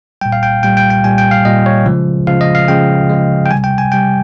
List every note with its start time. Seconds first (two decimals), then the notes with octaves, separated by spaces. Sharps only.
0.21 A#2 G3 G5
0.33 F5
0.43 G5
0.63 A#2 G3 G5
0.77 G5
0.90 G5
1.04 A#2 G3 G#5
1.18 G5
1.31 F5
1.45 A#2 G3 D#5
1.66 C#5
1.86 C#3 F3 G#3
2.27 C#3 F3 G#3 F5
2.41 D#5
2.55 F5
2.68 C#3 F3 G#3 G5
3.09 C#3 F3 G#3
3.46 G5
3.50 G3 G#5
3.55 C3
3.64 G5
3.78 G#5
3.91 C3 G3 G5